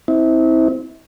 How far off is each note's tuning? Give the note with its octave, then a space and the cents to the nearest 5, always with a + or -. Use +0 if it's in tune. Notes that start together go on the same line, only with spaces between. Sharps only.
C4 +0 E4 -35